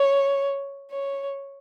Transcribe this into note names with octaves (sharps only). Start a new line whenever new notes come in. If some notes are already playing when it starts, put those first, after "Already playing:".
Already playing: C#5
C#5